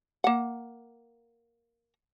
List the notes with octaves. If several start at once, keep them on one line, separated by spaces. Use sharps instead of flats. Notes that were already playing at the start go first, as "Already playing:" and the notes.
A#3 F#5